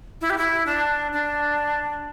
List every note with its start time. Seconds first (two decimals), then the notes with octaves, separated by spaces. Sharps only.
0.21 E4
0.30 G4
0.38 E4
0.66 D4
1.13 D4